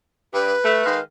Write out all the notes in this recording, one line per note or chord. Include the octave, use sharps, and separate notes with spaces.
G2 B4
A3
D#3 G#3 F5